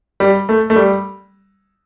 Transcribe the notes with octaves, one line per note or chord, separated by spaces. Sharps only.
G3
A3
A3
G3